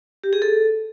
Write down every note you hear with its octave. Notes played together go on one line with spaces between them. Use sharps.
G4
G#4
A4